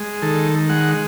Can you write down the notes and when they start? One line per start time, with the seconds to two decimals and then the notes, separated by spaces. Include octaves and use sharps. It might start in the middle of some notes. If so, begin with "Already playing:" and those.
Already playing: G#3
0.22 D#3 A4
0.69 G#3 F#5